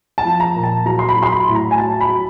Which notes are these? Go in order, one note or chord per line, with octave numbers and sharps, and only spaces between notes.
A5
F3
A#5
A#2
A5
F#3 A#5
C6
B5
F#3
C6
B5
A2
A#5
G#5
F#3 A5
B5
F#3